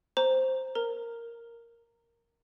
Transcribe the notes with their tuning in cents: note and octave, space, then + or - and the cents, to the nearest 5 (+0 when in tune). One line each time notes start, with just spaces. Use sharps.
C5 +0 A#5 +0
A#4 +0 A#5 -15